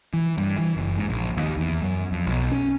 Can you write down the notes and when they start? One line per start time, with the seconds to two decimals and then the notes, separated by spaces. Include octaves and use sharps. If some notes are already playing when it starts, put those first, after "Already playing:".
0.14 E3
0.38 G2
0.58 E3
0.77 F#1
0.97 G#2
1.09 A#1
1.37 D#2
1.58 E2
1.82 F#2
2.12 F2
2.27 B1
2.52 C#4